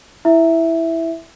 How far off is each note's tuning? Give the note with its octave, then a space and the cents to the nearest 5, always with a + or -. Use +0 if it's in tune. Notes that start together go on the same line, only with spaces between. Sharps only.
E4 +0 E5 +0